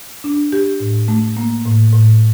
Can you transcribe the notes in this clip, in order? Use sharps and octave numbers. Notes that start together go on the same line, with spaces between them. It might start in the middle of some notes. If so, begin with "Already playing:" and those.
D4
G4
A2
A3
A#3
A2
A2